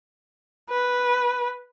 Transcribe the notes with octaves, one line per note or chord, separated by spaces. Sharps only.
B4